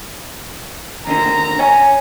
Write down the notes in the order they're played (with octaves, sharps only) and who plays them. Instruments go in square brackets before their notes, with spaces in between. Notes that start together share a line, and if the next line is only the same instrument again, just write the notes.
[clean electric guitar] D#2 D3 [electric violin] A#5
[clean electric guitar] C#5 G#5